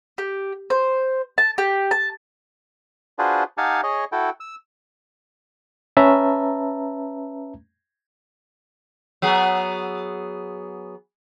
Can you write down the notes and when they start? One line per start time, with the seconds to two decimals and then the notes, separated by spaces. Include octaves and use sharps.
0.18 G4
0.70 C5
1.38 A5
1.58 G4
1.91 A5
3.19 D4 F4 F#4 G#4 B4 C5
3.58 D#4 G4 F5 F#5 G#5 A5
3.83 G#4 C#5 D#5
4.12 E4 F#4 A4 G5
4.40 E6
5.97 C#4 B4 E5 A5 A#5
9.22 F#3 B3 G#4